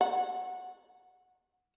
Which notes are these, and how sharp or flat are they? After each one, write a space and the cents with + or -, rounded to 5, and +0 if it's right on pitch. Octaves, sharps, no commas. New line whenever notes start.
F#5 -15